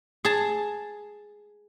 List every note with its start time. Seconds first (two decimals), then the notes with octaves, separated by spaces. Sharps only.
0.25 G#4 A5